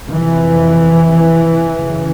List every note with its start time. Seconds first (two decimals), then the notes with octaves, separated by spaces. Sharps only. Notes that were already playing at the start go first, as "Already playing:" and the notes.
0.11 F2 C3 E3
1.73 F#2 C#3